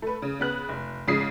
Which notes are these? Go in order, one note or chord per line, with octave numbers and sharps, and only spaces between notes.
A3 B4
C#3
C#3 B3 F#6
F1
G#2 C#3 F3 D#6 B6 C7